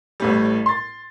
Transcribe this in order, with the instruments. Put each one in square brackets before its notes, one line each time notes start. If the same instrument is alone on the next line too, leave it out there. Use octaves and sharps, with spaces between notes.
[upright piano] A1 A2 G3
C6 A6